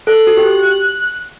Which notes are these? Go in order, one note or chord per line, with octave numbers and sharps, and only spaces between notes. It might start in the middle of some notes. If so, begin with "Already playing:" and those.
A4 F#6
F#4
G4